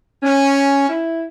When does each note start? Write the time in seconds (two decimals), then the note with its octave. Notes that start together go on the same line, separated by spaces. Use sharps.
0.22 C#4
0.88 E4